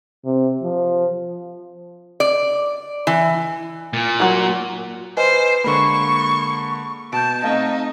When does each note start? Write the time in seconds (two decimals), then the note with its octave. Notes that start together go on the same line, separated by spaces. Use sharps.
0.25 C3
0.63 F3
2.20 D5
3.07 E3
3.93 A#2
4.20 F#3 A#4
5.17 B4 C5 D#5 G#5
5.64 D3 G#3 A#3 B5 C#6
7.13 B2 A5 G6 D7
7.44 A3 C4 D#4 D#5 F5